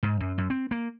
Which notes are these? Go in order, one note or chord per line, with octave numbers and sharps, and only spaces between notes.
G#2
F#2
F#2
C4
A#3